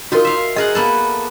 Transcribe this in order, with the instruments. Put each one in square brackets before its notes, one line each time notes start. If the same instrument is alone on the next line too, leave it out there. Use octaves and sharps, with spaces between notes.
[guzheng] D#4 F4 [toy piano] F#4 A#4
[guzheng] E5 F5
[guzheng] G#4 A#4 F#5 [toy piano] D#5
[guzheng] A#3 B3 A4